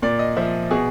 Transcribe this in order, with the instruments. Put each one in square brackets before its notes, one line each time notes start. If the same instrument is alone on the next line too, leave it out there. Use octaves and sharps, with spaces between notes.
[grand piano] A#2 D5
D#5
F3 E5
B2 G#4